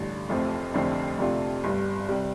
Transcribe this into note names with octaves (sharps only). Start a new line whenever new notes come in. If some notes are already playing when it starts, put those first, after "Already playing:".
Already playing: A1 G2 D3
F1 F2 F3 A3 C4
F1 F2 D3 A3 C4
F2 C3 A3 D4 F4
G1 G2 G3
C3 G3